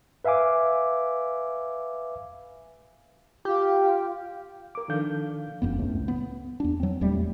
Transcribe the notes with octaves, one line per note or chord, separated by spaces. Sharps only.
B4 E5 F5 G#5 D6
F4 G4
A#4 D6
D#3 F3 D4 A4 F5 G6
F1 F#2 B3
C#2 A2
B3
E2 D4
F#3 C4
D#1 E2 G3 A3